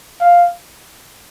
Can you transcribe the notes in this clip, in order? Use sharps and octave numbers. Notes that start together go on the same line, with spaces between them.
F5